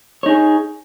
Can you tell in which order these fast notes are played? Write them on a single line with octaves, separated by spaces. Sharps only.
C#5 D#4 G#4